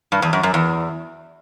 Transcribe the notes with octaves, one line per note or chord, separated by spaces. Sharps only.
G2
E2
F#2
F#2
E2